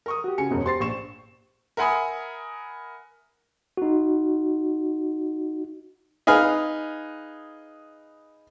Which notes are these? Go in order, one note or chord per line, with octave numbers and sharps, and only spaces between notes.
A#4 C#6 D#6
F#4 G4
C#3 G#5 C#7
E1 F#2 B2
G4 C5 C6 A6 C7
A#1 C#6 E7
A#4 E5 F#5 G#5 B5 D#6
D#4 F#4
D#4 G#4 B4 F5 G#5 F6